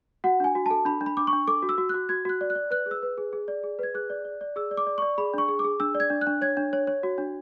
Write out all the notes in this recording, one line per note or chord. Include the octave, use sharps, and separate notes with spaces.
F#4 F#5
D4 G#5
F#4
A4 A5
D4 B5
D4
B5
D4 D6
C#6
D4
A4 D6
F#4
E6
F#4
F#4 F#6
F#4 G#6
F#4 F#6
D5
F#6
D5
B4 F#6
G#4
E6
B4
G#4
G#4
D5
G#4
B4 G#6
G#4 F#6
D5
D5
D5
G#4 E6
D5
D6
D5
D5 C#6
G#4 B5
D4 C#6
G#4
G#4 D6
D4 E6
D5
G#6
D4
F#6
D4
C#5 G#6
D4
C#5
C#5
F#4
D4